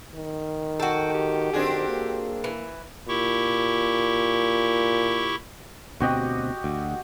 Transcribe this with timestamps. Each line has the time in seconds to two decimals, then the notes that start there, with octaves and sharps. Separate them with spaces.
0.15 D#3
0.80 F#4 A4 G5
1.13 G4
1.53 D#3 C4 D4 G#4
1.88 A#3
2.44 E3
3.08 A#2 E4 G4 C#6
6.00 D2 B2 C4 F#4 G4 D#5
6.64 D2